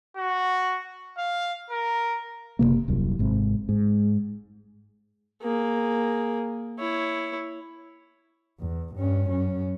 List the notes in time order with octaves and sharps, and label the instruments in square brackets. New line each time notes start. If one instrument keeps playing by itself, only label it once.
[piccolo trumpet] F#4
F5
A#4
[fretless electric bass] F#1 D#2 C3 A#3
D#1 C2 F#2
G#1 G#2 C3
G#2
[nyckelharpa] A#3 G#4
E4 C#5
[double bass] E2
G2 C#4
F#2 C#4